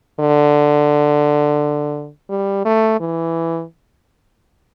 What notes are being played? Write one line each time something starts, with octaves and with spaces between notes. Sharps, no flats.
D3
G3
A3
E3